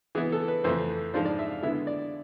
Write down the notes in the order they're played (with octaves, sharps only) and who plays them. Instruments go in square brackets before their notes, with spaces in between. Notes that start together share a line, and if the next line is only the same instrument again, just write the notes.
[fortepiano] E3 B3 E4 G#4
A4
B4
F2 E3 A3 C4 C5
G#2 F3 G#3 D4 F4 C5
D5
E5
F5
D3 G#3 B3 E4 E5
D5